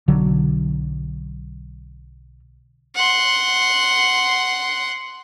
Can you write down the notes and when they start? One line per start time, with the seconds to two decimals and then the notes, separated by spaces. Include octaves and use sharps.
0.08 B1 D3 F#3
2.95 F#5 C6